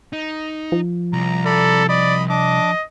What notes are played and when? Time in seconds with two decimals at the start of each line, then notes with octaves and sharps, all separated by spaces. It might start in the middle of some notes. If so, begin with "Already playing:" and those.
0.13 D#4
0.72 F3
1.13 C2 A#5
1.46 A4 D5 A#5 B5
1.89 D5 D#5 B5
2.30 D4 D#5 D6